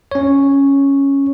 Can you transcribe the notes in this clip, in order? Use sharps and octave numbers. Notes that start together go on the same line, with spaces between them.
C#4 C#5